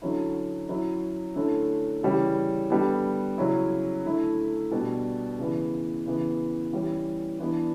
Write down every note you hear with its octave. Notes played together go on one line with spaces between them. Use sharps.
D3 F#3 C#4 E4
F#3 C#4 E4
D3 A3 C#4 E4
C#3 E3 G3 C#4 E4
D3 G3 B3
C#3 F#3 C#4 E4
D3 A3 E4
B2 G3 D4
C#3 E3 B3
C#3 E3 B3
E3 G3 C#4
E3 B3 D4